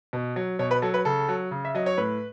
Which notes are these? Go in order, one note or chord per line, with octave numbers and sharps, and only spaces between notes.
B2
F#3
B2 C#5
B4
F#3 A4
B4
C#3 A4
F#3
C#3
E5
F#3 D#5
C#5
A2 B4